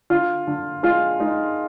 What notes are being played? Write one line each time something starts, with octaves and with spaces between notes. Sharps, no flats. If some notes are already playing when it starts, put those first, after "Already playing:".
D3 F4
D3
G#3 F4
G#3 D#4